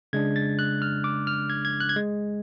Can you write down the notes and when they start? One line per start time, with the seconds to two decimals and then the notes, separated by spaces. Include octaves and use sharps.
0.13 C#3 G#3 D4 G#6
0.36 A6
0.59 F#6
0.82 F6
1.04 D6
1.27 F6
1.50 G#6
1.65 G#6
1.80 F#6
1.89 G#6
1.96 G#3